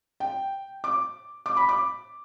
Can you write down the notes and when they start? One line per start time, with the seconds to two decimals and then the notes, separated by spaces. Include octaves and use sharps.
0.20 G5
0.84 D6
1.46 D6
1.57 B5
1.69 D6